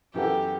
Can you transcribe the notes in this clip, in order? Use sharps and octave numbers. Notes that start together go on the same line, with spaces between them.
F#2 E3 B3 F#4 G4 A4